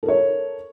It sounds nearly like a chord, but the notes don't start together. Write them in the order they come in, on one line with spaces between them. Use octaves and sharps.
A4 A#4 C#5